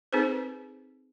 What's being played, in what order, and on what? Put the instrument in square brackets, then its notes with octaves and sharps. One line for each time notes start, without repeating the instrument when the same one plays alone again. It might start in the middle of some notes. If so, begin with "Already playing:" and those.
[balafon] C4 D#4 G#4 A4 B4 C5